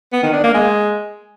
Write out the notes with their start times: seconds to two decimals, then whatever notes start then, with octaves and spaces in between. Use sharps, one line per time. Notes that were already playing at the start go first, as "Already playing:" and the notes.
0.13 B3
0.23 D#3
0.33 D4
0.44 A#3
0.54 G#3